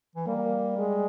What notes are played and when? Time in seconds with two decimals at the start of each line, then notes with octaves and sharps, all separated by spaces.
0.16 E3
0.27 G3 A#3
0.78 G#3